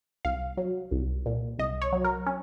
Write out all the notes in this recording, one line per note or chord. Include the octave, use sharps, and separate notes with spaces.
C2 F5
F#3
C2
A#2
C2 D#5
C#5
F#3
A#4
C#4